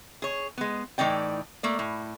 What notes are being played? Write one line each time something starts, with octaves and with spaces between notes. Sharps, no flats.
G#4 C#5
G#3 B3
A2 E3 D#4 D5 G5
A3 A#3 D5
A2